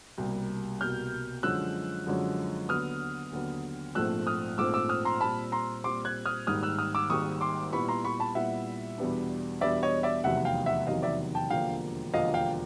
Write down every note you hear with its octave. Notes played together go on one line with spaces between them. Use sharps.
C2 B2 G3 A#3
C2 B2 G3 A#3 F6 G6
F#2 D3 F3 G#3 C#4 E6 F#6
F#2 D3 F3 G#3 C#4
D#2 D3 F#3 B3 D#6 F6
D#2 D3 F#3 B3
A#1 G#2 F3 A3 C4 E6 F#6
D#6 F6
A#1 G#2 F3 A3 C4 D6 E6
D6 E6
D#6 F6
A#5 C6
A#2 G3 C4 A5 B5
A#5 C6
A#2 G3 C4 C6 D6
F#6 G#6
D#6 F6
G#1 G#2 D#3 G3 A#3 D#6 F6
E6 F#6
D#6 F6
D6 E6
G#1 G#2 D#3 G3 A#3 C#6 D#6
C6 D6
A#2 G3 B3 E4 B5 C#6
A#5 C6
B5 C#6
A5 B5
A#2 G3 B3 E4 E5 F#5
E2 B2 G3 B3 D4
E2 B2 G3 B3 D4 D5 E5
C#5 D#5
D5 E5
F1 E2 C3 D#3 F#3 E5 F#5
F5 G5
E5 F#5
F1 E2 C3 D#3 F#3 D#5 F5
D5 E5
G5 A5
E1 D#2 D3 F3 A#3 F5 G5
E1 D#2 D3 F3 A#3 D#5 F5
F5 G5